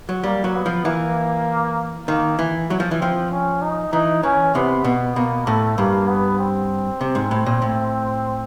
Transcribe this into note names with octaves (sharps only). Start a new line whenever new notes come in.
F#3
G3 A#3
F#3
B3
F3
E3 A#3
D#3 A#3
E3
F#3
F3
E3
F3 C4
C#4
D#4
E3 D#4
E3 C#4
C3 B3
B2 B3
B2 A#3
A2 A3
G2 A#3
B3
C4
C3
G#2
A2
A#2
A2